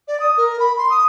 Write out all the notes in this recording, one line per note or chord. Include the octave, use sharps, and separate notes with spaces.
D5
D#6
A#4
B5
C6
D#6